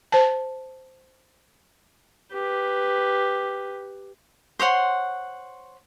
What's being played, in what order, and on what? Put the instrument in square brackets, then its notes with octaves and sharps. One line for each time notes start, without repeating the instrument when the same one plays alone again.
[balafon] C5 A5
[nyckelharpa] G4 B4
[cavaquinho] C5 C#5 F#5 C6